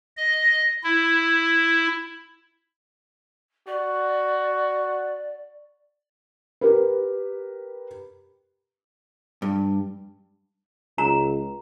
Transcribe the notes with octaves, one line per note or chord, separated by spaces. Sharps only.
D#5
E4
F#4 D5
G4 A#4 B4
G2
C#2 A#5